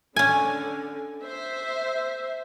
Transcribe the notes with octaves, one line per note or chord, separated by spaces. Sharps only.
D3 C#4 G#5
C5 E5